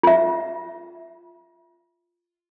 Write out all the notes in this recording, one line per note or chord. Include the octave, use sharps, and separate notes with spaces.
F4 E5